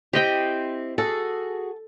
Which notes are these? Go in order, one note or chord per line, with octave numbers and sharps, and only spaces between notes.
C4 E4 G4 D#5 G5
F#4 G#4 A4